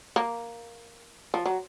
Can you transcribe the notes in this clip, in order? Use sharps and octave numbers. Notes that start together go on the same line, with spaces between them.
A#3
F3
F#3